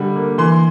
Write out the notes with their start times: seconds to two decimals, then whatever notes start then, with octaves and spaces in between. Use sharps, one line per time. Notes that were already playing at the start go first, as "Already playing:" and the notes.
Already playing: D3 G3 D4 B5
0.16 A#3
0.38 E3 C6